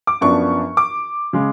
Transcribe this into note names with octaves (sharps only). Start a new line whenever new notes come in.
D6
F#2 F3 B3 D4 C#6
D6
C#3 G#3